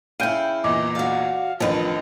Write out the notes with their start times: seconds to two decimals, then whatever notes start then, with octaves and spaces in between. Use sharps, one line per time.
0.20 C#3 E4 F5 G5 G6 D7 D#7
0.64 E2 A#2 E3 D#5 D6
0.95 F#4 D5 F5
1.60 A1 F2 D#3 F3 D4 B4 D#5 A5